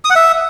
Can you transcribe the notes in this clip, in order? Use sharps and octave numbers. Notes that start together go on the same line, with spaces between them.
D#6
F#5
E5